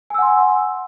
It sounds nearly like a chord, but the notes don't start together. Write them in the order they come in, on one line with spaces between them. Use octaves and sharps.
G#5 E6 F#5 C6